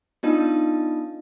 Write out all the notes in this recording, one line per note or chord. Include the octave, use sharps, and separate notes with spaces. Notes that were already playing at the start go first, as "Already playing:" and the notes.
B3 D4 D#4 F4 D#5 A5